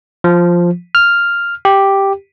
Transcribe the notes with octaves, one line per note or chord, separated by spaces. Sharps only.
F3
F6
G4